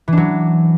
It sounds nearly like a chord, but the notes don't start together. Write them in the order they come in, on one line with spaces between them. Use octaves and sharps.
E3 D4 F#3